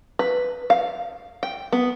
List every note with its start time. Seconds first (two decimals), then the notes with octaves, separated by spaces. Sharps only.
0.19 B4
0.70 F5
1.43 G5
1.72 B3